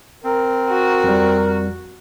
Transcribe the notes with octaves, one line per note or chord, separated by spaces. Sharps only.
C4 A#4
F#4
F2 G3